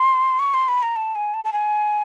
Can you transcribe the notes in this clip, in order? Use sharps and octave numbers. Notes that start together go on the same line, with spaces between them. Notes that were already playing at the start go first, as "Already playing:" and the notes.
Already playing: C6
C#6
C6
B5
A#5
A5
G#5
A5
A5
G#5